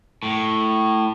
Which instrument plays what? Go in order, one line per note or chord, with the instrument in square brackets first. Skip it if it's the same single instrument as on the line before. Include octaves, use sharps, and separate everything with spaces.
[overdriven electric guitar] A2